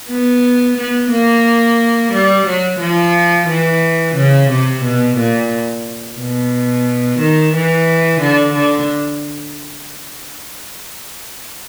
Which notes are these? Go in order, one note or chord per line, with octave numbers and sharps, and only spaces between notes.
B3
B3
A#3
G3
F#3
F3
E3
C#3
C3
B2
A#2
B2
D#3
E3
D3
D3